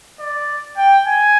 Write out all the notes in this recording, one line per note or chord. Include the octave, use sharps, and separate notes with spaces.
D5
G5
G#5